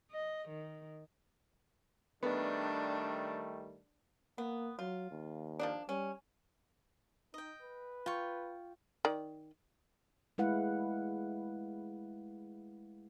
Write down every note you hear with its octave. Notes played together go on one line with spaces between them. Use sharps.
D#5
D#3
D#3 G3 A3 B3 D4
A#3 B3
F#3 F4
D#2
F3 A#3 D4
G3 C#4
D#4 D#5 G5
B4
F4 G5 C#6
D#3 D5
G#3 A3 E4 B4 F5 F#5